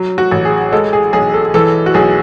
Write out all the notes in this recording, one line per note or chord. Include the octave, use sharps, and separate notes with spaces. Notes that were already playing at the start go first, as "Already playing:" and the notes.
Already playing: F#3
F#4
A1
G#4
G#3 A4
G#4
B1 G#4
A4
E3 A4
F#4
B1 G#4